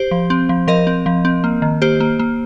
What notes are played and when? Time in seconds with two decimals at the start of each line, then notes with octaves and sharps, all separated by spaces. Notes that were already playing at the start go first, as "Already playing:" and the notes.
Already playing: G4 C5
0.11 F3
0.30 C4
0.49 F3
0.68 F3 A#4 D#5
0.87 C4
1.06 F3
1.25 C4
1.44 A#3
1.62 D#3
1.82 A#3 G4 C5
2.00 A#3
2.19 A#3